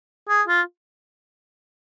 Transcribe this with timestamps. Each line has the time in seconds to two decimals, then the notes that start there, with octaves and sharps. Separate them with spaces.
0.29 G#4
0.48 F4